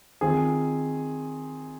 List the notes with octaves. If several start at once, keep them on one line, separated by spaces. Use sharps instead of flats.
D#3 C4 F4 G#4